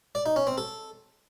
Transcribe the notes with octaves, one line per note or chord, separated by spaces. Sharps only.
D5
D#4
C#4
C4
A4